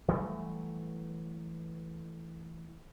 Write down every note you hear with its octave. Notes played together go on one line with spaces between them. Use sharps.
E3 F#3 G3 A3